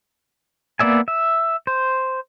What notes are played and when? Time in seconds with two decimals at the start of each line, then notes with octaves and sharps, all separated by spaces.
0.79 A#3 B3 D5 E5 G#5
1.08 E5
1.67 C5